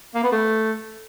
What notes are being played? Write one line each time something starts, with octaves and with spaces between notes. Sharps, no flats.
A#3
B3
A3